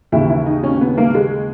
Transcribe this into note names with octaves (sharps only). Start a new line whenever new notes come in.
D#2 C#3 E3 E4
E4
D#4
C#4
B3
A#3
G#3